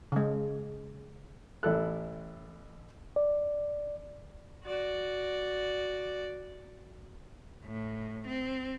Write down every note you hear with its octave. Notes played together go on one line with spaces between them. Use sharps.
C#3 G#3
A1 E4 A4 F#6
D5
F#4 D5
A2
C4